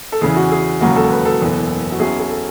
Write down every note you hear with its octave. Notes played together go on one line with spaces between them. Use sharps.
A4
E2 C#3 E3 G#4
F#4
G#4
E1 D#2 C#3 F#3 F#4
A4
B4
A4
F#1 E2 B2
F#4
B1 B2 F#3 C#4 E4 G#4
G#4
A4